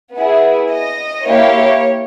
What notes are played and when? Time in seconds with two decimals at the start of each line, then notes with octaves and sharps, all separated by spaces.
0.14 B3 E4 G#4
0.69 D#5
1.25 A#3 E4 G4 C#5